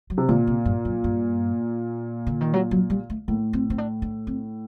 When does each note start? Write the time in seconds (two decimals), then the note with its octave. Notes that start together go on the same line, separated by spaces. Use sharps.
0.10 F#3
0.18 C3
0.29 A#2 D3
0.47 C3
0.65 G2
0.85 F#2
1.04 G2
2.27 D3
2.41 D#3
2.53 F#3
2.71 F#3
2.90 G3
3.10 A3
3.28 A2 A#3
3.53 C4
3.70 C4
3.78 D4
4.02 D4
4.27 C4